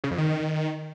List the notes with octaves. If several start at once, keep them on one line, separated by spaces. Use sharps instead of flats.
C#3
F2
D#3